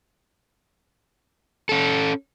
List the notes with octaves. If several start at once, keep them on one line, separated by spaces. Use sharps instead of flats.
C#4 A4